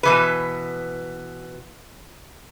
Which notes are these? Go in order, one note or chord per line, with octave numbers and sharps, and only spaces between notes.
B2 E3 B4